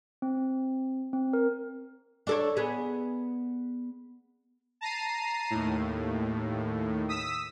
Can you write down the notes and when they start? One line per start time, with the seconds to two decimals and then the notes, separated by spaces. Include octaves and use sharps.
0.22 C4
1.13 C4
1.33 A#4
2.27 D4 A4 C#5
2.57 B3 G#4
4.81 A5 A#5 C7 D#7
5.51 D#2 A2
7.09 D#6 E6 B6